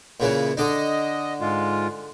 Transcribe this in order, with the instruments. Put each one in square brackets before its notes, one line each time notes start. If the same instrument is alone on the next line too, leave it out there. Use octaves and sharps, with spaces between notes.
[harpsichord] A#2 C#3 E3
[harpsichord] D3 D4 [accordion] D#5
[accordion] G#2 G#3 F4